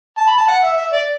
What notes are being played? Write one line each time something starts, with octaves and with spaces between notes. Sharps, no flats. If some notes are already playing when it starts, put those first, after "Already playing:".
A5
B5
A5
F#5
E5
E5
D5